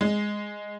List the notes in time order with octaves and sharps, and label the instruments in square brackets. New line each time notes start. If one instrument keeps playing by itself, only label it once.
[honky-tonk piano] G#3